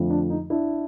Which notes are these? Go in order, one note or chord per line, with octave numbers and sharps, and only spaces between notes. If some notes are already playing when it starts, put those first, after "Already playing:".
Already playing: F2 D3 F3 A3
D4
D#4
D4 E4